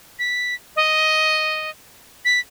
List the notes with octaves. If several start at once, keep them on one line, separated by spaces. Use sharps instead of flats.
B6
D#5
B6